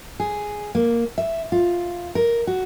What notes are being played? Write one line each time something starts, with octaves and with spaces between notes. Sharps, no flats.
G#4
A#3
E5
F4
A#4
F#4